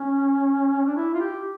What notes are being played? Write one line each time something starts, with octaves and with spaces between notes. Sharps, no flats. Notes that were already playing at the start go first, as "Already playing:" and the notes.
Already playing: C#4
D4
E4
F4
G4